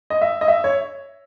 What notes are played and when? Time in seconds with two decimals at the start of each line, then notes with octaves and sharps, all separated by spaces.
0.10 D#5
0.21 E5
0.41 D#5
0.48 E5
0.64 C#5